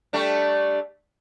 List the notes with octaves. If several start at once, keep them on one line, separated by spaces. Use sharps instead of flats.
G3 A3 D4